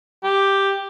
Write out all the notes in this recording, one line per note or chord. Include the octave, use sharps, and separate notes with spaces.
G4